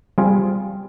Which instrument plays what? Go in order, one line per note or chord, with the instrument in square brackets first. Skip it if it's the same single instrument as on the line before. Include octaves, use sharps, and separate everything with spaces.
[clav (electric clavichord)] G3 C4 F4 G#4